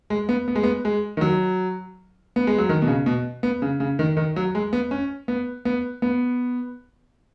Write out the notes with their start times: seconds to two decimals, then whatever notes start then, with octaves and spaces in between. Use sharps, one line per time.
0.10 G#3
0.29 B3
0.48 B3
0.55 G#3
0.63 B3
0.85 G#3
1.17 D#3
1.21 F#3
2.36 B3
2.47 G#3
2.58 F#3
2.69 D#3
2.82 B2
2.88 C#3
3.06 B2
3.43 B3
3.62 C#3
3.80 C#3
3.99 D#3
4.17 D#3
4.36 F#3
4.55 G#3
4.73 B3
4.91 C#4
5.28 B3
5.65 B3
6.02 B3